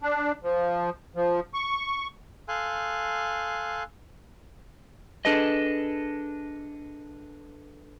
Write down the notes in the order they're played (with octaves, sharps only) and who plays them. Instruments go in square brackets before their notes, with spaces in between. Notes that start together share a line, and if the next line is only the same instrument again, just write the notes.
[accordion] D4
F3
F3
C#6
[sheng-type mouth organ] A4 F5 G#5 C6 F#6
[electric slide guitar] D4 G#4 A4 B4 D#5